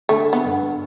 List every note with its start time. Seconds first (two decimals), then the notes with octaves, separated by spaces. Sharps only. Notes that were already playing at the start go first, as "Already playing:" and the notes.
0.09 D3 A3
0.33 B3
0.45 G2